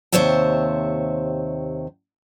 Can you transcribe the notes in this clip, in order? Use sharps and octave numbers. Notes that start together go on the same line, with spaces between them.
D#2 C3 C5 C#5 E5 A5